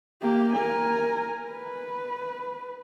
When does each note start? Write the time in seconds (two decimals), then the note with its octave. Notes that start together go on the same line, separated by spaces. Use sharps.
0.22 A#3 G4
0.53 A#4 G#5
1.51 B4